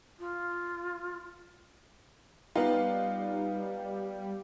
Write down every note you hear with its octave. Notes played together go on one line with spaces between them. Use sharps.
F4
G3 B3 D#4 F4